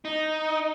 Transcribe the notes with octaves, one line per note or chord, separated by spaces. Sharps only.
D#4